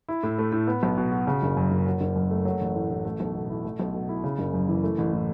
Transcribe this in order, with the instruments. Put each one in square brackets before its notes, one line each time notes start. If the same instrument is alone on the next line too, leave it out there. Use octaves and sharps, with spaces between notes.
[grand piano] E4
A2
A3
A2
B3
B1
B2
F#4
C#3
F#1
F#2
F#1
F#3
F#1
F#2
A3
F#3
A1
A2
A1
A3
B1
B2
E4
A3
B1
B2
E4
C#3
F#1
F#2
E3
A3
A1
A2